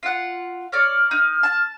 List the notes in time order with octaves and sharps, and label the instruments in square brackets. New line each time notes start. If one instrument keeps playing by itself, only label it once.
[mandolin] F4 F#5
[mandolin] C#5 D5 [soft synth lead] F6
[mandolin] D#4
A5